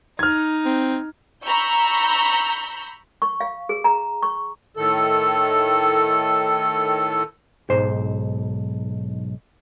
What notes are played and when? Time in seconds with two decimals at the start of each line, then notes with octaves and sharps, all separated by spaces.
0.19 D#4 F6 G#6
0.65 C4
1.44 A#5 B5 C#6 E6 G6
3.22 C#6
3.41 F5
3.69 G#4
3.84 A#5
4.22 C#6
4.77 A2 D#3 A4
7.70 B1 G#2 C5